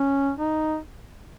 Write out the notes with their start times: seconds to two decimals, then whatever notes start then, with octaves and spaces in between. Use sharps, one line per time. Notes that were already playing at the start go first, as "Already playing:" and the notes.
Already playing: C#4
0.37 D#4